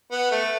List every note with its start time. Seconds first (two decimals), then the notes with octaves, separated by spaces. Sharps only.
0.12 B3
0.31 A3